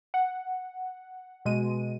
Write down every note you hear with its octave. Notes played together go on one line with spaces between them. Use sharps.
F#5
B2 G#3 D#7